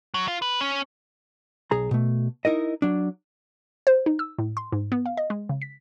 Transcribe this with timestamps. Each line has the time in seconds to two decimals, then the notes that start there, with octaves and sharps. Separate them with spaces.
0.14 F#3
0.28 F4
0.42 B4
0.61 C#4
1.71 B1 G#4 A#5
1.91 B2 A3
2.45 D#4 E4 A#4 D#5
2.82 F#3 D4
3.87 C5
4.06 D#4
4.19 E6
4.38 A2
4.57 C6
4.72 G#2
4.92 B3
5.06 F5
5.17 D#5
5.30 G#3
5.49 C#3
5.62 B6